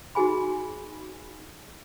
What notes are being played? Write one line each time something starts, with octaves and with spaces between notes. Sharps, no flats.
D#4 F#4 G#4 G#5 B5